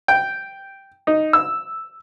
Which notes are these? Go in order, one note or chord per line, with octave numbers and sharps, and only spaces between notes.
G5
D#4
E6